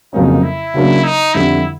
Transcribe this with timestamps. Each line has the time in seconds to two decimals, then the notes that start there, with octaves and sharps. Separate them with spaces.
0.13 F2 C#3 F#3 A#3 C#4 D#4
0.43 E4
0.74 C#3 F#3 A#3 D4
1.04 D#4
1.34 F2 D3 G3 E4